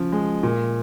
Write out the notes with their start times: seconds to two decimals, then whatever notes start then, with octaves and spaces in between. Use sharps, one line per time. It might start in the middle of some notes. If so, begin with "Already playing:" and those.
Already playing: C#3 F3
0.12 G#3
0.43 A#2